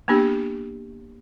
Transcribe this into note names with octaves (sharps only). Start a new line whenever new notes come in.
A#3 B3 D4 G4